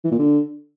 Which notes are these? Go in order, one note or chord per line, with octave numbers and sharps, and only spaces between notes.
E3
A#2
D3